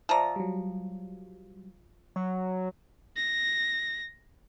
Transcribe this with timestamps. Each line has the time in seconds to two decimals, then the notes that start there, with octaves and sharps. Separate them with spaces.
0.09 F3 D5 E5 A5 A#5
0.36 F#3 G3
2.16 F#3 C#5
3.17 A#6